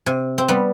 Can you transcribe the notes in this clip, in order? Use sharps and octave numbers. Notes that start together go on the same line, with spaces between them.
C3
C4
G3 B3